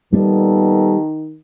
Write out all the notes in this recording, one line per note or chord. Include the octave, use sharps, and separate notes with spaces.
A#2 D#3 G3 B3 A4